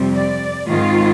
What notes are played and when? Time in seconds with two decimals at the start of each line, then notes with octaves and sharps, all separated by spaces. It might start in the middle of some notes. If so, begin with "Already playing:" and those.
Already playing: F2 C3 G3 C4
0.15 D5
0.68 G#2 D#3 G#3 C4 F4